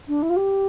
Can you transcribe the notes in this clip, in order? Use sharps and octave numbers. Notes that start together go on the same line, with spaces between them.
D4
E4
F4
G4